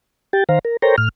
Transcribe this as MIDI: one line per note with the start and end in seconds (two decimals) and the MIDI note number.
0.33 0.44 67
0.33 0.44 79
0.33 0.44 93
0.49 0.59 51
0.49 0.59 72
0.49 0.59 77
0.49 0.59 82
0.65 0.77 70
0.82 0.96 69
0.82 0.96 70
0.82 0.96 72
0.82 0.96 73
0.82 0.96 79
0.82 0.96 82
0.98 1.09 45
0.98 1.09 89